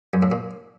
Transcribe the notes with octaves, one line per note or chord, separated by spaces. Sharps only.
F#2
A2
A#2